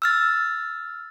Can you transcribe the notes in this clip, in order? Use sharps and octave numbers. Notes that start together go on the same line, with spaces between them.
E6 F6 A6